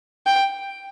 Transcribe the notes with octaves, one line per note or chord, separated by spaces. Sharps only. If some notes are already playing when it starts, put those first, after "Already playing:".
G5